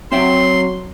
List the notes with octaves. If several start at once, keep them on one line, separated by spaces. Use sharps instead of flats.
F#3 C4 E5 G5 C6